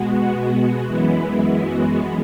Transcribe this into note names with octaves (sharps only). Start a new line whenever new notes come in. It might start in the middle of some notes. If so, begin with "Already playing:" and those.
Already playing: B2 G#3 B3 F#4
F#2 E3 G#3 B3 E4
F#4